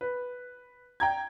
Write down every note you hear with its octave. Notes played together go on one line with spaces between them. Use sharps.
B4
G5 A#5 G#6